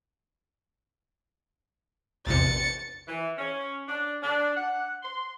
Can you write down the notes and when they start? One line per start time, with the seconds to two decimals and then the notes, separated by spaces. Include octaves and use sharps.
2.26 A#1 E2 C3 A6 C#7
3.07 E3
3.37 C#4
3.87 D4
4.22 D4
4.56 F#5
5.02 C6